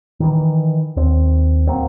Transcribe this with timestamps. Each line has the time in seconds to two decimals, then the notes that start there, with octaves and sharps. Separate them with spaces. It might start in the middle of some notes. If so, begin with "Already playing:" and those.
0.20 D#3 E3
0.96 D#2 C4
1.67 D1 F#3 A#3 C4